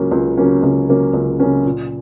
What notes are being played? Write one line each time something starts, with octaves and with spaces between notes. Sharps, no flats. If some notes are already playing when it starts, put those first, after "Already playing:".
Already playing: C#2 C#3 F#3 A#3 C#4
C#2
C#3 F#3 A#3 C#4
C#2
C#3 F#3 A#3 C#4
C#2
C#3 F#3 A#3 C#4
A#2